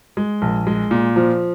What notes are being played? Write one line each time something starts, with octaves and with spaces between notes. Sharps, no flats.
G#3
A#1
G#3
A#2
F3